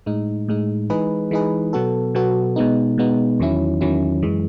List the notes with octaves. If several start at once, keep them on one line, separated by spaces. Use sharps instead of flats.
A2 G#3 D#4
A2 G#3 D#4
E3 G#3 D#4 G#4 B4
E3 G#3 D#4 G#4 B4
B2 F#3 B3 F#4 A4
B2 F#3 B3 F#4 A4
B2 G#3 B3 D#4
B2 G#3 B3 D#4
E2 D#3 F#3 C#4 E4
E2 D#3 F#3 C#4 E4
F#2 E3 G#3